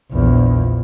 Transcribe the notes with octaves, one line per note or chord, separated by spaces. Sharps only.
A#1 E2